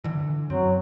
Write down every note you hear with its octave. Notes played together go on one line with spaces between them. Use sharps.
D3 E3
F#2 F#3 C4